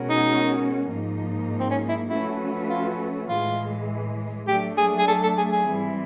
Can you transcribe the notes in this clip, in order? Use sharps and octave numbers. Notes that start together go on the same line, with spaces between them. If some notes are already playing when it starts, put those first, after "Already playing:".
Already playing: B2 G#3 C#4 F#4 A#4
D#4
G#2 F3 A#3 D#4
C4
C#4
E4
F3 A3 C#4 E4 F#4 B4
F4
A2 E3 G#3 F4
F#3 A3 D4 G4
G#4
G#4
A4
A4
G#4
G#4
G#2 E3 G3 C4 E4